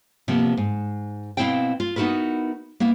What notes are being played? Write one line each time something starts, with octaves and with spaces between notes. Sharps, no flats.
C3 F3 A#3 B3
G#2
B2 A#3 C4 E4 F5 G5
F4
B3 D#4 E4 F#4 A#4 B4
A#3 B3 E4